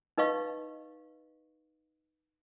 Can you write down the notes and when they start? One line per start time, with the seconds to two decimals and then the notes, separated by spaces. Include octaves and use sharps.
0.18 D#4 B4 D#5 F5 C#6